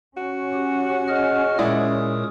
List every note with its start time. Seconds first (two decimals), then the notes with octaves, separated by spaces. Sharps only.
0.17 C#4 F#4
0.53 G4
1.08 G#4 D#5 F6
1.59 A#2 G#3 E4 A#4 D5 D#6